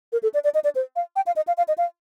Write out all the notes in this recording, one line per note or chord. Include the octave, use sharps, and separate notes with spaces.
A#4
A4
D5
D5
D#5
D5
C5
F5
G5
F5
D#5
F5
F5
D#5
F5